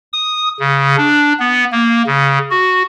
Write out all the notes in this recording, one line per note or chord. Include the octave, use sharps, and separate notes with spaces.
D#6
C#3
D4
B3
A#3
C#3
F#4